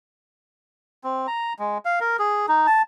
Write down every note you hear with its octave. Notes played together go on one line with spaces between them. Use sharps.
C4
A#5
G#3
F5
A#4
G#4
D#4
A5